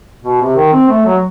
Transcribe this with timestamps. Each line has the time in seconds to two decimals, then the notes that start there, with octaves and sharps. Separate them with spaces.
0.24 B2
0.41 C3
0.56 D#3
0.72 C4
0.89 A3
1.05 F#3